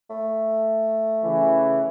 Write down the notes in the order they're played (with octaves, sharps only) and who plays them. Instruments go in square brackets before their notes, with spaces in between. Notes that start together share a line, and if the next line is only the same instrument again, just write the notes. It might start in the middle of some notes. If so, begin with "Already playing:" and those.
[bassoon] A3
[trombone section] C#3 E3